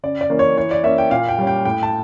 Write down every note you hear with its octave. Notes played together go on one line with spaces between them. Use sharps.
C#3 D5
D5
E3 A#3 C#4
C#5
E3 C#5
D5
A#3 C#4 E5
G5
A#2 F5
G5
G3 C#4
G5
A2 G5
A5